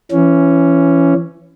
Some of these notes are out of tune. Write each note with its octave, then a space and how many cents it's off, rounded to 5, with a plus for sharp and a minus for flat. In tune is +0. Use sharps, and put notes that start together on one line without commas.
E3 +25 C#4 +0